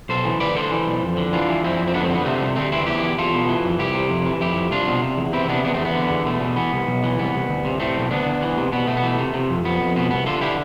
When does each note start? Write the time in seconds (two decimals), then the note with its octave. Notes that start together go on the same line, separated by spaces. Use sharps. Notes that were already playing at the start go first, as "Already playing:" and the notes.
0.09 B1 A4 C5
0.25 E3
0.40 D2 B4 D5
0.56 D3 A4 C5
0.71 E3
0.87 B1
1.02 F2
1.17 D3
1.33 E3 D4 F4
1.49 E3
1.64 F2 C4 E4
1.79 F2
1.88 C4
1.94 D3 B3 D4
2.04 A3 C4
2.10 D3
2.15 B3
2.25 C3 A3 C4
2.41 C2
2.56 D2 A3 C4
2.72 E3 C4 E4
2.86 E2 E4 G4
3.03 E2
3.18 E2 F4 A4
3.33 B2
3.49 E3
3.64 F2
3.79 C2 E4 G4
3.95 C3
4.10 F2
4.26 E3
4.40 F2 E4 G4
4.56 F2
4.71 C2 D4 F4
4.88 B2
5.02 C3
5.18 E2
5.33 E3 C4 E4
5.48 C3 B3 D4
5.64 E2 B3 D4
5.74 A3 C4
5.80 E2
5.85 B3
5.95 D3
6.11 E2
6.26 B2 A3
6.41 B2
6.56 E3 B3
6.72 C2
6.87 B1
7.04 E3
7.19 C2 B3
7.34 C2
7.49 D2
7.65 C3
7.80 A2 A3 C4
7.96 B1
8.11 D2 B3 D4
8.26 D2
8.42 E3
8.58 C3
8.72 B2 B3
8.87 B2 A3
8.97 B3
9.03 E3 A3
9.19 C3
9.34 C3
9.50 F2
9.65 F2 B3
9.81 F2
9.96 B2 B3
10.11 C2 B3
10.26 D3 F4 A4
10.41 D3 E4 G4